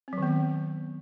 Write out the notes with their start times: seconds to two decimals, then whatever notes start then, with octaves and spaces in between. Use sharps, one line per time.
0.08 C4
0.13 F#3
0.18 D#3
0.23 B3